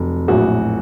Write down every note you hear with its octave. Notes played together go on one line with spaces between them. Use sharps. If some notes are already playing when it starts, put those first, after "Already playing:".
Already playing: F1 F#3
A#1 A2 F#3 F#4